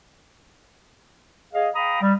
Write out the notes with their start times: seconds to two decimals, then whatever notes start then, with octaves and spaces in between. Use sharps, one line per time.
1.54 G#4 D#5 F5
1.75 F5 G5 A#5 B5 D#6
2.02 G3